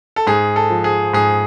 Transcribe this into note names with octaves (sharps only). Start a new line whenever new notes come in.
A4
G#2 G#4
A4
F3
G#4
G#2 G#4